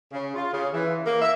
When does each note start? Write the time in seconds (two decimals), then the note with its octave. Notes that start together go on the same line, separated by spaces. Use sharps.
0.12 C#3
0.35 F4
0.51 C#3
0.72 E3
1.04 A#3
1.19 E5